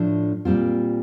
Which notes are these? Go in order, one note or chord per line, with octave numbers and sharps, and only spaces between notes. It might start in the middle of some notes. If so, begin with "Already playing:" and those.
Already playing: A2 F3 A3 D4
A#2 G3 C4 F4